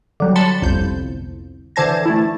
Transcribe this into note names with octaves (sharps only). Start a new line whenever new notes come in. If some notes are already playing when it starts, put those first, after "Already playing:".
D3 F#3 G3
A5 B5 C6 A6 C#7
G1 C2 F2 G6
D3 E3 C5 A5 G#6 A#6
A3 E4